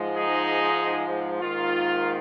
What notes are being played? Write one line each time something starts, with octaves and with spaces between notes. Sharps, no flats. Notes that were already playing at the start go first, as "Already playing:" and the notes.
Already playing: G#2 F3 G#3
D#4 G#4
G#2 D#3 A#3 F4